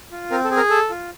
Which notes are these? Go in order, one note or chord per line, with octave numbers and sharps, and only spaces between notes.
F4
C4 A#4
A4
G#4
A#4
A4
F4